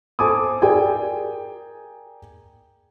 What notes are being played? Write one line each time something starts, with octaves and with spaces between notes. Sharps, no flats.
A4 C5 G#5 A5 D6 D#6
G#4 A#4 D5 G5 G#5